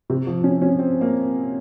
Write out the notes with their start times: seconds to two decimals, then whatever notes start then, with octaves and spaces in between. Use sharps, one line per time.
0.10 C3
0.27 F3
0.44 C#4
0.62 C#4
0.79 C4
1.01 A#3